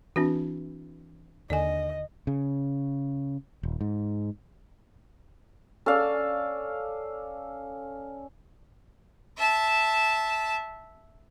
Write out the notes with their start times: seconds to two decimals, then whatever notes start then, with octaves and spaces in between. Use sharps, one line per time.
0.16 E3 C4 D4 F#4
1.50 D#2 D3 D5 D#5 G#5
2.27 C#3
3.63 D#1
3.81 G#2
5.86 C#4 A4 D5 F5
9.37 E5 A5